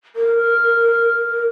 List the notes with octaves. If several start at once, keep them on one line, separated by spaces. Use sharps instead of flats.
A#4